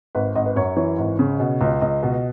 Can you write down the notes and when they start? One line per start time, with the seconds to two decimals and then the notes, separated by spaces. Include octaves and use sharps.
0.15 G#1 B4
0.35 G#1 D#5
0.46 B4
0.56 F#2 C#5
0.77 E3 C#5
0.98 G#1
1.19 C#3
1.40 B2
1.61 C#2
1.81 C#2 D#5
2.03 B2